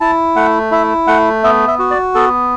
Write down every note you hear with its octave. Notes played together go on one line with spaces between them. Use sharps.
E4 A5
A3 F#5
E4 E5
A3 F#5
B3 E5
E5
F#4
D5
B3 A4